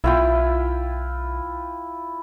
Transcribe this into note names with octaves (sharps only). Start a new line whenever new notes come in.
B1 E4 F4 G5